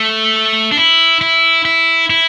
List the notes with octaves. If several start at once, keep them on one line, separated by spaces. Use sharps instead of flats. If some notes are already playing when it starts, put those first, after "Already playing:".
Already playing: A3
D4
E4
E4
E4
E4